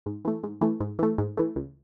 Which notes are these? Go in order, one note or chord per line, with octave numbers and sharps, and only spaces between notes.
G#2
E3 A3
G#2
E3 A3
G#2
E3 A3
G#2
E3 A3
C#2